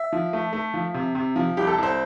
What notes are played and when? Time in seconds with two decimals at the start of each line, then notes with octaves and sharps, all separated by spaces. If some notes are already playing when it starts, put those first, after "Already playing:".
Already playing: E5
0.12 F3
0.33 A3
0.53 A3
0.74 F3
0.94 C3
1.15 C3
1.36 F3
1.57 C2 G4
1.67 A4
1.78 C2 C5